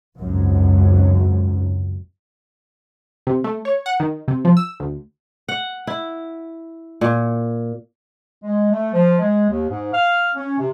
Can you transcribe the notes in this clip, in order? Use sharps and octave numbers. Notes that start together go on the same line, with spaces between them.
G#1 C#2 F#2 F#3
C3
A3
C#5
F#5
D#3
C3
F3
E6
D2
F#5
E4
A#2
G#3
A3
F3
G#3
D#2
G#2
F5
C#4
C3